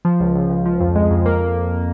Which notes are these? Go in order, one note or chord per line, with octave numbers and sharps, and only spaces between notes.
F3
C#2
C#2
C#2
F3
F2
G#3
F2
A#3